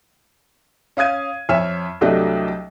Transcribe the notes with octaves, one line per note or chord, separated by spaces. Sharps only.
C#4 F5 D#6 G#6 D#7
F2 C#5 E5 F6 E7
C2 F#3 A3 D4 G4 D#5